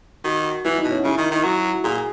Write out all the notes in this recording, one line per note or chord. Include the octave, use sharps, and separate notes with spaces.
D#3 F#4
E3 E4
D#4
B2
C#4
C#3 E4
D#3
D#3
F#3 F#4
A#2 G#4